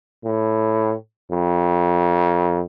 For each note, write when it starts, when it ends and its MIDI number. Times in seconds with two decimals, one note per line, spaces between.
0.25 0.95 45
1.31 2.63 41